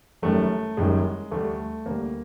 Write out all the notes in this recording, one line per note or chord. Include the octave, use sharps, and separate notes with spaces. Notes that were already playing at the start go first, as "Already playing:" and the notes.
F#1 F#2 D#3 G3 A3
F#1 F#2 D#3 G3 G#3
D2 D3 G3 A3
D2 D3 G3 A#3